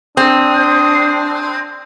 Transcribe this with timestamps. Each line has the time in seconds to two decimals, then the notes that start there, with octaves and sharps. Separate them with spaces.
0.17 C4 D4 D#6